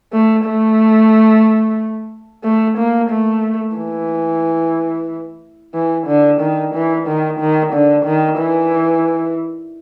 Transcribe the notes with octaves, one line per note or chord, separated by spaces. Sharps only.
A3
A3
A3
A#3
A3
E3
E3
D3
D#3
E3
D#3
D#3
D3
D#3
E3